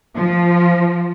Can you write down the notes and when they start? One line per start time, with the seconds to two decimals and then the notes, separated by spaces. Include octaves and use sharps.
0.15 F3